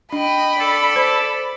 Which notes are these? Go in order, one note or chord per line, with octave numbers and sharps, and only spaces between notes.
D4 D#5 G5 B5
A4 D5
C5